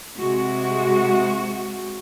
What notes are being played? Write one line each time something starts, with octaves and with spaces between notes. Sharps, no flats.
C3 G#3 F#4